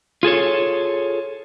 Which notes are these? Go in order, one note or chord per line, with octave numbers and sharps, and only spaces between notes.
F4 G#4 A4 C#5